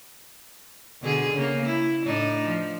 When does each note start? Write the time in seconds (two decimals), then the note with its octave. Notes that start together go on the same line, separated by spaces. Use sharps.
1.02 B2 D3 G#4
1.34 C#3 A#3
1.66 E4
2.05 A2 D4 D#4
2.46 F3